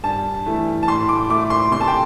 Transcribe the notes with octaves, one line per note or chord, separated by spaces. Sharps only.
G2 A5
E3 A3
A5
A2 C6
D6
A3 D6
C6
C3 C6
A5
G5